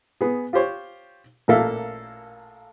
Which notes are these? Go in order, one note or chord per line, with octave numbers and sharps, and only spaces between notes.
B3 G#4
F4 G4 C5 C#5
A1 A#2 A#3 A4 E5 F5